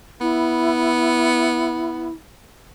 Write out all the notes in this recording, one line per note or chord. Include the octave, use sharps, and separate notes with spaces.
B3 E4